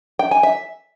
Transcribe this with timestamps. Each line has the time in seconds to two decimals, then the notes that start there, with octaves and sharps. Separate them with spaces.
0.19 G5
0.31 G#5
0.43 E5